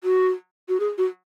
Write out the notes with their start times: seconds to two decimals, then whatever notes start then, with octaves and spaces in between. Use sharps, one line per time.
0.04 F#4
0.69 F#4
0.80 G#4
0.98 F#4